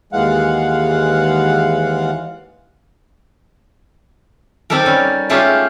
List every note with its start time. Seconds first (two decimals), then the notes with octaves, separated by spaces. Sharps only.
0.13 D#2 E3 G#3 F5 F#5
4.70 C4 D#4 G4 A4 A#4
4.86 G3 C#4
5.30 G#3 A3 C#4 F4 G4